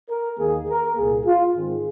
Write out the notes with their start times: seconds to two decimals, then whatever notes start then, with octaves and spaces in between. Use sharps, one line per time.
0.09 A#4
0.39 D#2 D#3 A#3 G#4
0.68 A#4
0.96 C2 A#2 A#3 G#4
1.25 F4
1.54 G#2 D#3 G#3 C4 G#4